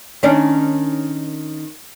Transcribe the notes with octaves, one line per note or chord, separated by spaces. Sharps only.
D#3 C#4 D4